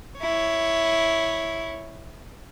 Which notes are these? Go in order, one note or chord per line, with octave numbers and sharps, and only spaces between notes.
E4 C#5